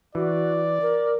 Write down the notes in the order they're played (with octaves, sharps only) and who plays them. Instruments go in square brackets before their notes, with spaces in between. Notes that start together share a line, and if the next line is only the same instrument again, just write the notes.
[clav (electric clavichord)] E3 [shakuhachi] F#4 [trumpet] D5
[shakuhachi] A#4